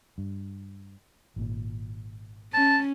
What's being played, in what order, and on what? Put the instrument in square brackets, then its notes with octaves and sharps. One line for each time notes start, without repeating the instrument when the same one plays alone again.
[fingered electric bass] G2
G#1 A#2
[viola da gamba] C#4 [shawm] A5